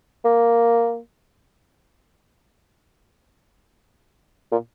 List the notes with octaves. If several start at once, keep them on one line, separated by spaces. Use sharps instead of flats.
A#3
A#2